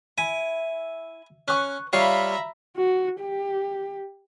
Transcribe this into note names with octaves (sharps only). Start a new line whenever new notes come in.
E4 G#5
C#4 B4 C#6 F#6
G3 F4 C#5 E5 F5 A#5 B5
F#4
G4